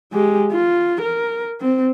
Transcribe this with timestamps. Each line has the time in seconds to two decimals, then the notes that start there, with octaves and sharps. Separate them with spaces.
0.13 G#3 G4
0.52 F4
1.01 A#4
1.61 C4